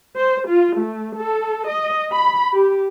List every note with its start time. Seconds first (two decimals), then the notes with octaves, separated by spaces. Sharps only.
0.16 C5
0.49 F4
0.79 A3
1.18 A4
1.70 D#5
2.13 B5
2.54 G4